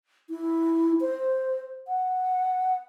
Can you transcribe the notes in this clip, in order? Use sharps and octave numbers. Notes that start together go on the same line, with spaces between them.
E4
C5
F#5